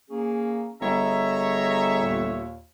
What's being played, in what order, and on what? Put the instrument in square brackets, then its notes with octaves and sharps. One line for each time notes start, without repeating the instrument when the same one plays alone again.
[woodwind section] A#3 C#4 G#4
[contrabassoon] G1 [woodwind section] G#4 D#5 A#5 [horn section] C#5 E5
[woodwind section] D#2 A#2